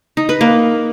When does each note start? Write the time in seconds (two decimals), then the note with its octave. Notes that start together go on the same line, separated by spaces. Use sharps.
0.17 D#4
0.29 B4
0.41 A#3